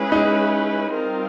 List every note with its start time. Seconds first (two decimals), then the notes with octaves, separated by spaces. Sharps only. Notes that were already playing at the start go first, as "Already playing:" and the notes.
Already playing: G#3 C#4 E4 G#4 B4
0.12 D#4
0.92 G3 C4 F4 A#4